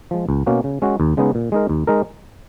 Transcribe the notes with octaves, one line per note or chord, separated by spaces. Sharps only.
F3 G#3
C#2
B2 A#3 C#4 F#4
C#3
G#3 C#4 F#4
D#2
C#3 G#3 B3 D#4
A#2
G#3 D#4 A#4
D#2
G#3 D#4 A#4